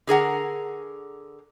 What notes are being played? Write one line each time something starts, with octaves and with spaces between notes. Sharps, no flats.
D3 G#4 A#4 F#5